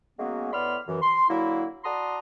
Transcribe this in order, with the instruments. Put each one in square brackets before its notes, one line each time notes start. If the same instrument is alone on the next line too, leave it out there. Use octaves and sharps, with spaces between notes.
[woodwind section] F#3 G#3 A#3 B3 C#4 F#4
A2 B3 D5 B5 C6 F6
F#2 E3
C6
D3 F#3 A#3 E4
F#4 D5 A5 A#5 C6 D#6